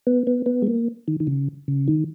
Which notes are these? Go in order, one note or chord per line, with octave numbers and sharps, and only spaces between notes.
B3
B3
B3
G#3
A#3
D#3
D#3
C#3
C#3
D#3